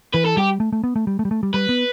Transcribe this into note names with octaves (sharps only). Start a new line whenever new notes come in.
E3 B4
A4
G3 G4
A3
A3
B3
A3
G3
A3
G3
A3
G3
G3 B4
B3